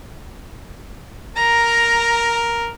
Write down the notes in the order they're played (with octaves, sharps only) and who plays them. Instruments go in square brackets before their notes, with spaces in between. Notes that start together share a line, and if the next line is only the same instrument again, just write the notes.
[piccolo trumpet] A#4 [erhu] A#5